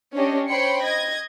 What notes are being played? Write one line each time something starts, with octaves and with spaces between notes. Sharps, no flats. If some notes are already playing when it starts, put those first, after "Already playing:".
C#4 D4 G4 C#5 D#5
C5 C#5 G5 B5 C6 C#7
D#5 G#6 A#6